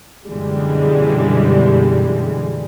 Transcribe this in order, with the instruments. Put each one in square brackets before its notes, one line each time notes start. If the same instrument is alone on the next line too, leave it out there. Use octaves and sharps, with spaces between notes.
[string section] F#2 B2 D3 E3 G3 G#3